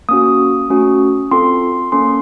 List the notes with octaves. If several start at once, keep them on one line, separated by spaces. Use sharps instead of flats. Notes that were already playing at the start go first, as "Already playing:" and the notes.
A#3 C#4 F#4 D#6
A3 C#4 F#4
C4 F4 A4 C6
A#3 C#4 A4 C6